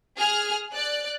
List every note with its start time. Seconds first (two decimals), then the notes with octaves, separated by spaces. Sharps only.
0.18 G#4 F6
0.73 D5 F#6